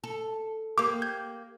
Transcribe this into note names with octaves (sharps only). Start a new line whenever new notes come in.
A4
A#3 G4 D6
G6 G#6